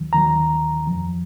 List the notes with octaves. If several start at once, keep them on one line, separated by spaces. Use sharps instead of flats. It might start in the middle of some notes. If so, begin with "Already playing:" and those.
Already playing: D#2 D#3 F#3
D#2 D#3 F#3 A#5
F2 F3